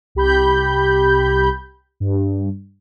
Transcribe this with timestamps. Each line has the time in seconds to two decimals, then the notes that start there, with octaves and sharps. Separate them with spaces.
0.15 C2 G4 B5 G6
2.00 G2